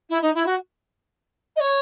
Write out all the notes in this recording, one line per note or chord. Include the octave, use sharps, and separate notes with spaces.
E4
D#4
E4
F#4
D#5
C#5